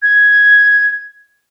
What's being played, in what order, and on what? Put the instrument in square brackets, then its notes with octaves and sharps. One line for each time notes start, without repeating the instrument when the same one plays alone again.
[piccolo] G#6